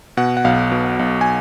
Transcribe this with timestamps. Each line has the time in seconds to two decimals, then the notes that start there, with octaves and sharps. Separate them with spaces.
0.17 B2 F#5
0.37 F#5
0.44 B1 F5
0.72 B2
0.99 B1
1.21 G#5